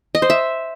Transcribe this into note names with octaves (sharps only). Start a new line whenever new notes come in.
D#5
C5
E5